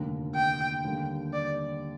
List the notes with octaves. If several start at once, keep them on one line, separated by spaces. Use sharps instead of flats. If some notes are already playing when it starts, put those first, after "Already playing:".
Already playing: F1 D#2 D3
G5
D#2 D3 G3
D5